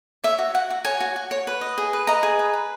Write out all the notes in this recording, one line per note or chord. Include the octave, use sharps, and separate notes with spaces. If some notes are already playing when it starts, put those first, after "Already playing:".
C#5 E5
F#4
F#4 F#5
F#4
C#5 G#5
F#4
F#4
C#5
B4
D#5
G#4
B4
D#5 A#5
G#4
B4
B4